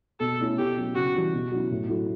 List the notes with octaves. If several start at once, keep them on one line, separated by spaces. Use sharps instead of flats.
B2 A4
A3 C#4 E4
B2 G4
F#3 C#4
C#3 F#4
E3 G3
B2
F#3 C#4 E4
A2
F#3 A3 E4